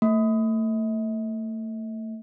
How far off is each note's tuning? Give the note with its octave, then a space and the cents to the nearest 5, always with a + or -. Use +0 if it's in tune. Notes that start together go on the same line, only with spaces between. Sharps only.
A3 +30